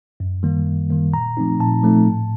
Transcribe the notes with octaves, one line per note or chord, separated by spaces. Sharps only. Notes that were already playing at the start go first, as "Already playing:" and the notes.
F#2
D#3 G3 A#3
F#2
D#3 G3 A#3
A#2 A#5
F3 A3 C4 D#4
A#2 A5
F3 A3 C4 D#4
A2